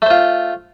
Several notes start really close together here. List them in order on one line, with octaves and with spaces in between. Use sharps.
A3 C5 F4